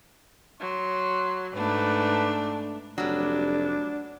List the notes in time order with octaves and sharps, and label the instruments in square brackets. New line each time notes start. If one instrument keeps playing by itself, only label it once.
[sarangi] F#3 [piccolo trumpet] C6
[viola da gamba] G#2 A3 [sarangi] D4 [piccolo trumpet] B4
[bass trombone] F1 [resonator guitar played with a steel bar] F#3 G3 [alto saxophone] D4